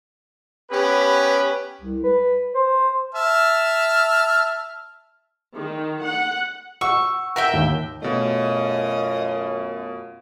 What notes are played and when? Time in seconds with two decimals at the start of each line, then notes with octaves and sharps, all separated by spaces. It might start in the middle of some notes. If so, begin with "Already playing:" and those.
0.70 B3 C#4 G4 B4 B5
1.82 C2
2.04 B4
2.55 C5
3.15 E5 A5 F6
5.55 D#3
6.02 F#5
6.81 F#5 C#6 E6
7.36 A#4 E5 F#5 G5
7.53 D#2
8.02 F#2 B2 A3 F4 D#5